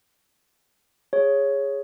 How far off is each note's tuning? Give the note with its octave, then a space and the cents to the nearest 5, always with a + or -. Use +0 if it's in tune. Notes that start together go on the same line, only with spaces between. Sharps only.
G#4 -15 C#5 +0